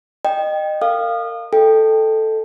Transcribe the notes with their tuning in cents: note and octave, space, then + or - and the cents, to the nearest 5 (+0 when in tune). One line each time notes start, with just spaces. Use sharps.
D#5 -25 G5 +0
A#4 -35 F5 +0 D#6 -35
A4 +0 D#5 +0 G5 +10